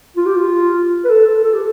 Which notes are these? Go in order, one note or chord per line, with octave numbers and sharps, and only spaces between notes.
F4
G4
F4
B4
A4
A4
A4
G4